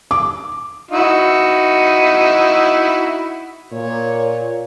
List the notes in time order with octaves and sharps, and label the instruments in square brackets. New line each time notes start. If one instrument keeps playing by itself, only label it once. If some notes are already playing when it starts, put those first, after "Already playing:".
[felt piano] D6
[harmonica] D#4 E4 F#4
[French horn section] A#2 [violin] C#5